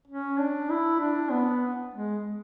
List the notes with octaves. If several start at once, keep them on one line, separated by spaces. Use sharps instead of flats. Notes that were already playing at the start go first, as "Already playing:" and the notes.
C#4
D4
E4
D4
B3
G#3